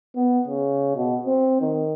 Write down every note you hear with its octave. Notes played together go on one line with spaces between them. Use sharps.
B3
C#3
B2
C4
D#3